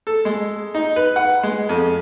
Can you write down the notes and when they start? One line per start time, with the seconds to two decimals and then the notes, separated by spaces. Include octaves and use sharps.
0.07 A4
0.25 G#3
0.75 D#4
0.96 B4
1.16 F#5
1.43 G#3
1.69 F2